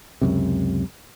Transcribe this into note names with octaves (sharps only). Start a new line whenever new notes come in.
C#2 F#2 C3